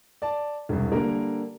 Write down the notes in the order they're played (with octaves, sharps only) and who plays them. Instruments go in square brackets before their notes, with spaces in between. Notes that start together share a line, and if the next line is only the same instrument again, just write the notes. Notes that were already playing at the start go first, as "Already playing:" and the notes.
[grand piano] D5 A5
E1 C2
D3 G3 A#3 A#4